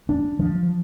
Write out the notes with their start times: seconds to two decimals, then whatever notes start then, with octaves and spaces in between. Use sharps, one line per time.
0.09 D4
0.39 F3